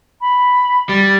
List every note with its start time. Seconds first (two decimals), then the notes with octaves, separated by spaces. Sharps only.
0.21 B5
0.89 G3 A6